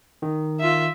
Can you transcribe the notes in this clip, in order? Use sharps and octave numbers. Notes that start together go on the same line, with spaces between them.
D#3
F4 E5